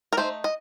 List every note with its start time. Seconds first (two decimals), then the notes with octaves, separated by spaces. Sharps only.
0.13 A#4
0.17 A3 D#4 C5
0.44 D#5